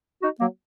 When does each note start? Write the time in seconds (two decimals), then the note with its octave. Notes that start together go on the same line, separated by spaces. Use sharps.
0.22 D#4 F#4
0.40 F#3 A#3